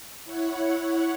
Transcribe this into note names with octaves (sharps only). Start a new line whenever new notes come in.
E4 C#5 F#5